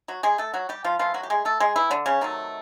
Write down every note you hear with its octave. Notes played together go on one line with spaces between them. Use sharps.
F#3 F#4
G#3 G#4
A3 A4
F#3 F#4
G3 G4
F3 F4
E3 F3 A3 F4
F#3 F#4
G4
G#3 G#4
A3 A4
G#3 G#4
E3 E4
D3 D4
C#3 C#4
C3 D#3 F#3 A3